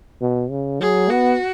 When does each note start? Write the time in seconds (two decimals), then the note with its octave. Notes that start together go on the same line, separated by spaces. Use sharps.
0.21 B2
0.50 C#3
0.80 F#3 G#4
1.10 B3 F#4